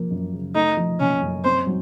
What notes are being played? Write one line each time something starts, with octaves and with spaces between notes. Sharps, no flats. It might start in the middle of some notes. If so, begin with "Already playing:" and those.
Already playing: F3 A#3
F#2
C#3
A3 D#4
F3
F#1 C#4
F#2
C4 C5
F#3